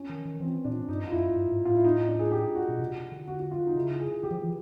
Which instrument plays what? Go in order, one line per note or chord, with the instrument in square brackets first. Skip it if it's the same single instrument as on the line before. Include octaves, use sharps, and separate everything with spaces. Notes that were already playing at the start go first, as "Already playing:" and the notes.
Already playing: [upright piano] C#4
[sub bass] D#3
D#3
[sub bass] E3 [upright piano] C4
[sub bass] A#2 [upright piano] D4
[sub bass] G2 [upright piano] D#4
[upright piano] F4
[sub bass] F#2 [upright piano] E4
[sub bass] G2
G#2
[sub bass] A2 [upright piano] F4
[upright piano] E4
D#4
D4
G#4
G4
F#4
[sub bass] B2
C3
D3
[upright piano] F#4
F#4
F4
D#4
[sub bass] C#3 [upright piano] E4
[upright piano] G#4
[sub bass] D3 [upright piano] G4
[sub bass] F3
E3